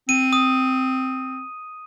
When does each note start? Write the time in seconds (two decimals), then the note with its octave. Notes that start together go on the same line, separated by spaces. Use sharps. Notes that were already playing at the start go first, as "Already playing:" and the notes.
0.09 C4 D#7
0.33 D#6